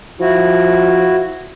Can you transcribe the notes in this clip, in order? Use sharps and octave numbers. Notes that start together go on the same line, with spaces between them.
F3 E4 F#4